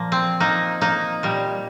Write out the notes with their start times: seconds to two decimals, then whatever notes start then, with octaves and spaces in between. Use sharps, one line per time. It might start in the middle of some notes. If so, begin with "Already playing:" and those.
Already playing: A#2 F3 A#3
0.12 C4
0.40 A#3 D#4
0.81 A#3 D#4
1.23 A#2 G3